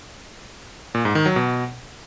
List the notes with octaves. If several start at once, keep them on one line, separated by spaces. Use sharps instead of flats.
A#2
G#2
D#3
F#3
B2